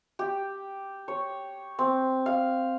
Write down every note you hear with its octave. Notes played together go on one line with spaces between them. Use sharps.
G4
C#5
C4
F5